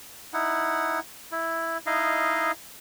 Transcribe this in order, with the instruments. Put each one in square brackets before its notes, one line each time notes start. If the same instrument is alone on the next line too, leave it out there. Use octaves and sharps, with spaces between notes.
[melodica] D#4 E4 F#5
E4
D#4 E4 D#5 F5